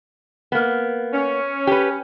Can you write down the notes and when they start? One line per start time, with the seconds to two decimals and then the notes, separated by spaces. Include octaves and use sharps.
0.52 A#3 B3
1.13 C#4
1.67 G4 B4